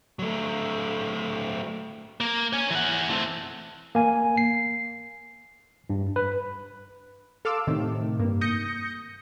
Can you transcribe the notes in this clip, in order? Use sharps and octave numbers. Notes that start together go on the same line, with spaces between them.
F#3 A3
A#3
C#5 G#5
E3 F#5
A3 C4
A#3 G#5
C7
G2
B4
A4 F5 C6 D6 E6
A2 C3 D#3
G2 A#3
D#6 G6 A#6 C#7